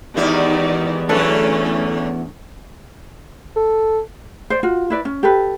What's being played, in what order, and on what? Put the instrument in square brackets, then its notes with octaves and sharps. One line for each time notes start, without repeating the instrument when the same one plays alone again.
[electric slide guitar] E2 [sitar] G#2 D#3 E4 [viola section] D#4 G4 D5
[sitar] A2 D3 F#3 [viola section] A3 C#4 [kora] D4 A4 B4
[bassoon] A4
[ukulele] C5 D5
F4 F#4
E4 B4 D5
C#4
G4 A4 B4